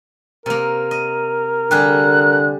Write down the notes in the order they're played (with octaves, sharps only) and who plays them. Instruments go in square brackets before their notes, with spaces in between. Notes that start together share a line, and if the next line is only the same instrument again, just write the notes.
[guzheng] C3 A#3 [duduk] A#4
[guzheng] D#5
[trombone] D3 [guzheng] G3 G4 G#4 [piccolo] F#6